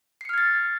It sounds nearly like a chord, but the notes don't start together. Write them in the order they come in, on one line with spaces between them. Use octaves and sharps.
C7 C#7 F6 G#6 A6